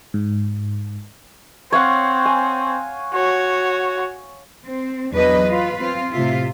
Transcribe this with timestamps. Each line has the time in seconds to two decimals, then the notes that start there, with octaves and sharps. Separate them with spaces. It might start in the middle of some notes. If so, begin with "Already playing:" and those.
0.14 G#2
1.72 C4 C#5 F5 F#5
2.26 G#5
3.14 F#4 C#5
4.66 C4
5.12 E2 F#3 D4 B4 D#5
5.48 F4 B4
5.79 C4 F4
6.13 A2 C3 F4 E5